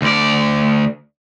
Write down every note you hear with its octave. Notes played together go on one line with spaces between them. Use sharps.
D2 D5